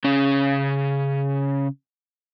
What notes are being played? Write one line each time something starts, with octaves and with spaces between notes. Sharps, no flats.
C#3 C#4